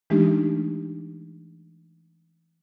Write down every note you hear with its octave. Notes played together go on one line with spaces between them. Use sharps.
E3 G#3 A3 D4 D#4 G4